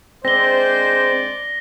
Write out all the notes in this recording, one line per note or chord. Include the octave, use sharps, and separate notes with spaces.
G#3 C4 D4 C5 D5 A#6 G7